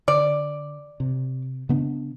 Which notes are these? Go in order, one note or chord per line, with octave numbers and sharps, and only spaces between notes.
D3 D5
C3
C#3 B3 D4